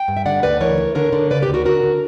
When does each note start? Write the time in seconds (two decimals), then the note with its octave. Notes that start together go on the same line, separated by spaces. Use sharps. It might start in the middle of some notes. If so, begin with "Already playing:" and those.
Already playing: G5
0.08 G2
0.17 E5
0.26 D3 D5 F#5
0.43 D2 B4 D5
0.60 E3 A#4 C#5
0.78 E3
0.95 D3 A#4 C#5
1.13 D3
1.30 C#3 B4 D5
1.42 G4 B4
1.49 D2
1.54 F#4 A#4
1.65 D3 F#4 A#4
1.83 D3